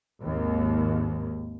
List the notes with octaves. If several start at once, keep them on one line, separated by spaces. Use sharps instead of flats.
G#1 D#2